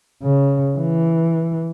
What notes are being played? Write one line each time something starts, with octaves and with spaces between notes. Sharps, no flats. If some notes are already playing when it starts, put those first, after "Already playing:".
C#3
E3